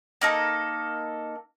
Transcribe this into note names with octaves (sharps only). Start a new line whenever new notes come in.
A#3 D#4 A4